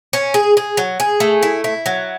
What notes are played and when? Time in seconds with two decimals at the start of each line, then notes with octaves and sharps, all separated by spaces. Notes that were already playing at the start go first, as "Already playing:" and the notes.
0.13 C#4
0.34 G#4
0.57 G#4
0.77 F#3
1.00 G#4
1.20 A3
1.43 E4
1.64 E4
1.86 F#3